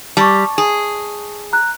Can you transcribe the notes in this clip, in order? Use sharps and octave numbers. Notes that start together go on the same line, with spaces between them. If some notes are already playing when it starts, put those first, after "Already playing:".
G3 A5 C#6
G#4
A#5 F#6